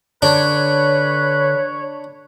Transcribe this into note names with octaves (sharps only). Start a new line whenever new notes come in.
D3 D4 B4 C#5